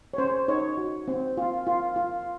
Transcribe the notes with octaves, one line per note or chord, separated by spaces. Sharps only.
C#5
C#4 C5
D#4 C#5
F#4
C4
F4
F4
F4